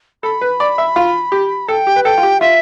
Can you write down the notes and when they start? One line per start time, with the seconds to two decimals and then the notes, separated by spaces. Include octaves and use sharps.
0.23 A4 B5
0.41 B4
0.60 D5
0.78 E5
0.96 F4
1.32 G4
1.68 A4 G5
1.87 G4
1.96 B4
2.05 A4 G5
2.18 F4
2.23 G4
2.41 F4 E5